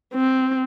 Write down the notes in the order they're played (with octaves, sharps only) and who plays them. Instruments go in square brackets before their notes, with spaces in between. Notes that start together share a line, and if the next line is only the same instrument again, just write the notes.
[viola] C4